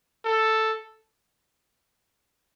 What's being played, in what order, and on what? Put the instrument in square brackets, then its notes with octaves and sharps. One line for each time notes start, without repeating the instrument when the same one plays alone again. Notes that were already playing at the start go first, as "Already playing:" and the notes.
[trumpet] A4